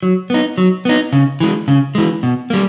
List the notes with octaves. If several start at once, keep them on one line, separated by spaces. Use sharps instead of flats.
F#3
B3 D#4
F#3
B3 D#4
C#3
E3 G#3
C#3
E3 G#3
B2
G3 A#3